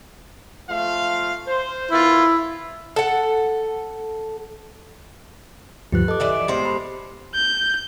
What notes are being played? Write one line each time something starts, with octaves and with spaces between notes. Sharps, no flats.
F3 A3 F5
C5
D#3 B3 E4 F4
A4 F#5
D2 G2 F3 G4 B4 F#6
A4 D#5 D6
E3 D5 E5
A2 G#3 B3 G4 C5
B5
G6